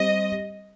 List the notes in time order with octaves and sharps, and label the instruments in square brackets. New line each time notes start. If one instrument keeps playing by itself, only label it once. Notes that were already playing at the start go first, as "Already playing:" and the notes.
Already playing: [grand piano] G3 C4 G4 C5 [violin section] D#5